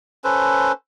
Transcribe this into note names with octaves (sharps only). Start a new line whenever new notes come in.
C#4 A4 B4 C5